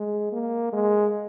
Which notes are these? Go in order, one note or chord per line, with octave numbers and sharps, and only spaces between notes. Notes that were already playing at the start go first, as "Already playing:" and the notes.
Already playing: G#3
A#3
G#3